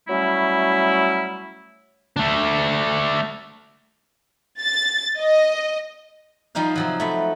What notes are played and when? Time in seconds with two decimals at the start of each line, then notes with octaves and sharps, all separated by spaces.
0.08 F#3 G3 A3 C#4 E4
2.16 A3 D4
4.61 A6
5.18 D#5
6.55 F3 G3 D#4 C5 F5
6.76 C3 F3 F#3
7.00 A3 B5